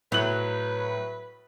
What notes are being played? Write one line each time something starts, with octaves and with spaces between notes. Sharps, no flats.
A2 F#3 B4 F#6 F#7